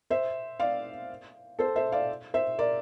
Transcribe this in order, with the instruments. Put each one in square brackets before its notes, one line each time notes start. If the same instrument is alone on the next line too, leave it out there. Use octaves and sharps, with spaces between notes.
[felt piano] C5 E5
D5 F5
A4 C5
C5 E5
D5 F5
C5 E5
A#4 D5